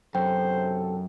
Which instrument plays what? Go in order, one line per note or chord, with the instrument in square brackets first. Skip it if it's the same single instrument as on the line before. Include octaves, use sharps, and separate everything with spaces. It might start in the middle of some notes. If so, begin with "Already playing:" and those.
[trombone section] B1 C3 A4 [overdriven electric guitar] F#2 [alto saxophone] C5 [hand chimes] G5